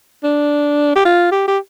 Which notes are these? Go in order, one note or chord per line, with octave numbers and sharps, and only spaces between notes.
D4
G4
F4
G4
G4